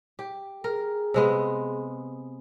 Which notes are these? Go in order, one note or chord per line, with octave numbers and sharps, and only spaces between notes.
G4
G#4 A#4
C3 G#3 B3